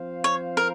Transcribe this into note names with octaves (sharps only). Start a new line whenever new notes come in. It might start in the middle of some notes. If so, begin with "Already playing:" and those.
Already playing: F3 C4 F4 C5 F5
C#5
A#4